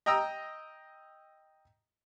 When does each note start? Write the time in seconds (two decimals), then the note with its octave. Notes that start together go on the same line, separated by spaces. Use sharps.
0.06 D#5 G5 A#5 D#6 E6